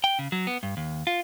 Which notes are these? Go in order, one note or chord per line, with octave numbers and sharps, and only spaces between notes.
G5
C#3
F#3
B3
G2
D#2
F4